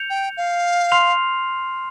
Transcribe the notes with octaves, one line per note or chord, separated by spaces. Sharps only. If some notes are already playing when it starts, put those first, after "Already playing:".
Already playing: G6 C#7 F7
G5
F5
C6 F6 C7 F7